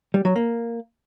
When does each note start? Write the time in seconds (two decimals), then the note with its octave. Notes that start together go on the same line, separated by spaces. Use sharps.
0.14 G3
0.25 F#3
0.36 A#3